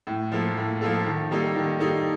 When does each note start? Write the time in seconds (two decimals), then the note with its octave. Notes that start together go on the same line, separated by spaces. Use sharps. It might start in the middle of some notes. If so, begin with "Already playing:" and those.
0.07 A2
0.32 F3 A#3 F4 A4
0.57 A2
0.81 F3 A#3 F4 A4
1.06 D#3
1.31 G3 A#3 D#4 A4
1.55 D#3
1.80 G3 A#3 D#4 A4